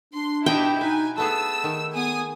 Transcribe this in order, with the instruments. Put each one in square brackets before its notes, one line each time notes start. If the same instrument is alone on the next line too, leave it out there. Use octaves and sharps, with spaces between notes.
[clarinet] D4 [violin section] C6
[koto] B2 D#4 E5 [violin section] E4 G4 [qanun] G5
[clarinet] D#4 [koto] B4 E5 [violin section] G#5
[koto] A3 B3 G#4 [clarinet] A5 [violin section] E6
[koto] D#3
[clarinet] B3 [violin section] G#4 G#5 D#6